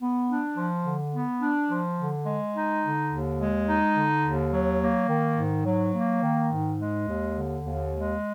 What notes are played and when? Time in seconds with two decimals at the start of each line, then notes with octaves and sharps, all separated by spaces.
0.01 B3
0.29 D4
0.57 F3
0.85 D3
1.13 B3
1.42 D4
1.71 F3
1.99 D3
2.26 G#3
2.54 D#4
2.83 D3
3.11 D#2
3.40 G#3
3.68 D#4
3.95 D3
4.24 D#2
4.52 F#3
4.81 A#3
5.08 D#3
5.37 G#2
5.66 F#3
5.93 A#3
6.22 D#3
6.50 G#2
6.79 G#3
7.07 D#2
7.35 D3
7.63 D#2
7.92 G#3